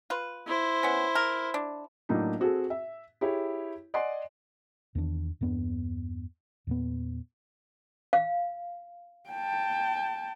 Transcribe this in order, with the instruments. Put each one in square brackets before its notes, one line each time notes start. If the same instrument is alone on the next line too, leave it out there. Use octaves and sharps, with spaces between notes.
[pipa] F4 B4
[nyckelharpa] E4 C5
[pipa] B3 C#4
A#4
D4
[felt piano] A2 F#3 A#3 D4 D#4
C4 F#4 G#4 A4
E5
E4 G4 G#4 C#5
D5 D#5 F#5 G#5 C6
[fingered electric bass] E2 D#3 C4 D4
E2 G2 B3 D4
E2 A#2 B3
[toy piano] F5
[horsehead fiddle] G5 A5